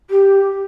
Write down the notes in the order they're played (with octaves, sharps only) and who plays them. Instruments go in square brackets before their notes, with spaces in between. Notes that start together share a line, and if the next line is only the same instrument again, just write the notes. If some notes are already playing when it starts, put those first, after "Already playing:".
[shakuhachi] G4